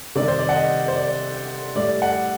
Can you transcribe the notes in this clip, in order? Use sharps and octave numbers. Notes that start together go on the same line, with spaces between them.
C3 D#3 G3 D5
C5
D5
F#5
D#5
C5
D5
A2 G3 D5
F#5